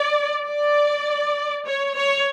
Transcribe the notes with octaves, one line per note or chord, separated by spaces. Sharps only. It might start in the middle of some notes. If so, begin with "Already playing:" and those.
Already playing: D5
D5
C#5
C#5